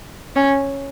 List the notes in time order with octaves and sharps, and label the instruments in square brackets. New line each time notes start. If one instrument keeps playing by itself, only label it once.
[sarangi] C#4